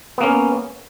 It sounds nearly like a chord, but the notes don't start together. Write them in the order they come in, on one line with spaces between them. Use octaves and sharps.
B3 A#3 C#4